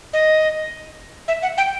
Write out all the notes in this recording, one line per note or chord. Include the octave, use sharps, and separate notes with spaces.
D#5
E5
F#5
G5